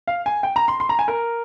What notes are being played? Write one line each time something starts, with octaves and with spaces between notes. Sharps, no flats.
F5
G#5
G5
A#5
C6
C6
A#5
G#5
A#4